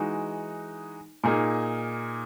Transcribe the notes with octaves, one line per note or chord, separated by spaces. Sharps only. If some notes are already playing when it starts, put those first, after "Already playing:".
Already playing: E3 G#3 D#4 F#4
A#2 A#3 D#4 G#4